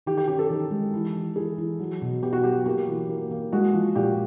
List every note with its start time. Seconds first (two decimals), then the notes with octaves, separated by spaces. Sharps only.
0.06 D#3 G4
0.18 G4
0.28 C#4 G4
0.39 A4
0.50 D#3
0.71 G#3
0.94 E3
1.15 E3
1.36 E3 G#4
1.58 E3
1.80 F#3
2.02 B2
2.23 B3 G4
2.33 F#4
2.44 F#3 G4
2.66 A#3 G4
2.87 E3
3.09 A#3
3.31 A#3
3.53 G#3 F#4
3.74 F3
3.95 A#2 G4